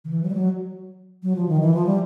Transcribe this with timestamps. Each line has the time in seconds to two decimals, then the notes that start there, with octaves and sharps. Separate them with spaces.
0.05 D#3
0.09 E3
0.23 F#3
0.30 G3
0.35 F#3
1.23 F#3
1.36 F3
1.48 D#3
1.61 E3
1.74 F3
1.86 G3